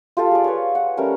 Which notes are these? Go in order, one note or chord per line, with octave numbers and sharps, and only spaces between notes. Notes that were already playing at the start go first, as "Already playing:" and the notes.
F4 G4 A4 F5
G#4 D5
B4 C#5
F#5
G3 A3 C#4 A#4